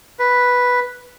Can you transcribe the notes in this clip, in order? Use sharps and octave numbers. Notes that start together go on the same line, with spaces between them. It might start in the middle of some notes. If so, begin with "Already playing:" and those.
B4